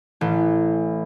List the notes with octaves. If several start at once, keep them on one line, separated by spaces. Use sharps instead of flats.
A1